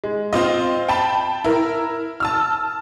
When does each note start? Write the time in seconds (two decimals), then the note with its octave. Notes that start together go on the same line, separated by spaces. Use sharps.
0.04 G#3
0.33 C4 F4 D#5
0.88 G5 A5 B5
1.44 E4 A#4
2.20 A5 E6 F6